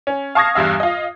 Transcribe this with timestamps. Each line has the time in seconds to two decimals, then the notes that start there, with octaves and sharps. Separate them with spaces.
0.07 C#4
0.35 F5 A5 C#6 D#6 G#6 A#6
0.55 E2 G2 G3 E5 F5
0.80 F4 D#5